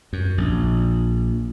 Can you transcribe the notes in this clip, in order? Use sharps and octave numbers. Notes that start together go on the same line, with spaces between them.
F#2
A#1